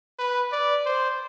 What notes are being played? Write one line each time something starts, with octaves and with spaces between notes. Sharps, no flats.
B4
D5
C5